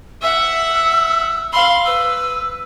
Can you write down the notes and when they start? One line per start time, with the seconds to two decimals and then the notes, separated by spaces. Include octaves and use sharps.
0.22 E5 F#5 E6
1.53 F5 B5 C6
1.85 B4 E6